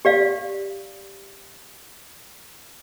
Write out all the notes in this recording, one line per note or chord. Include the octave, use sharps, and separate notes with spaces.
G4 D5 F5